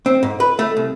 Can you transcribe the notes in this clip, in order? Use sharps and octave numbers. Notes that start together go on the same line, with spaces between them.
C4
G#2
B4
A3
C2